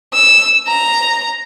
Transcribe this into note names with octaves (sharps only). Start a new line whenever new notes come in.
E6
A#5